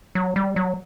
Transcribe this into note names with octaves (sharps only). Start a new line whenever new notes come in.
F#3
G3
F#3